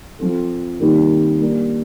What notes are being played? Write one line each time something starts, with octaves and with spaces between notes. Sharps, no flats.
F3 C4 F4 A4
C3 D#3 G3 A#3 D#4
G3 A#3 D4